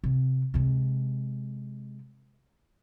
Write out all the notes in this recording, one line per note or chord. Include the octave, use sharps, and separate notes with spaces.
C3
C3 G#3